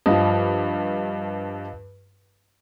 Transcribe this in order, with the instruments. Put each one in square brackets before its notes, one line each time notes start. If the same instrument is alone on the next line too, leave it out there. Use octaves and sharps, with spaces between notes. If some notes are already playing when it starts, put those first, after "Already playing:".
[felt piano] G2 F3 [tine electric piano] D#5 F5